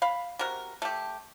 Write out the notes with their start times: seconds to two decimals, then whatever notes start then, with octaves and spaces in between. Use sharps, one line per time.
0.02 F5 B5
0.39 C3 F#4 A#4
0.82 A3 G4